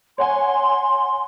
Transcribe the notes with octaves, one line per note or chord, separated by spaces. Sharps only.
C#5 F#5 G#5 C6